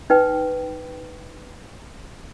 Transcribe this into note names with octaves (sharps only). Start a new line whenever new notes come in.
D#4 B4 G5